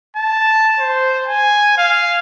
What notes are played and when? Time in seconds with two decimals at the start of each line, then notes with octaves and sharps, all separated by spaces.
0.16 A5
0.79 C5
1.27 G#5
1.78 F5